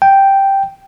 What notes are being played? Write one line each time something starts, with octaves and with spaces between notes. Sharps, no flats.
G5